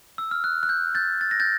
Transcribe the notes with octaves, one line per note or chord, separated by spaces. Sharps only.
E6
F6
F#6
F#6
G6
G6 A6
A6
A#6
G6 A6